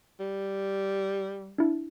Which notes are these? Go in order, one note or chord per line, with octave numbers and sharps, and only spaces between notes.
G3
D4 E4